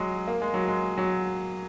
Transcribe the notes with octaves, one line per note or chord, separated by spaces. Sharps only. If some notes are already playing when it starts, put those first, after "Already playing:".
Already playing: F#3 G#3
A#3
G#3
F#3
G#3
F#3